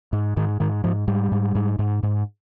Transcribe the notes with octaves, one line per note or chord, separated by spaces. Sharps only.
G#2
G#2 D#3
G#2 D#3
G#2 F3
G#2 G3
G#2
G#2
G#2
G#2